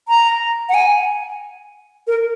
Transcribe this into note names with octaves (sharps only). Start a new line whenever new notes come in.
A#5
F#5
G#5
A#4